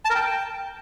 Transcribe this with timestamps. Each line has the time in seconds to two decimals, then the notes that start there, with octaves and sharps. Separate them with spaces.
0.05 A5
0.10 A#4
0.15 G5